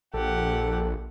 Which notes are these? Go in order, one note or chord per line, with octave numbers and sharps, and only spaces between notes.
A#1 G4 A4 F#5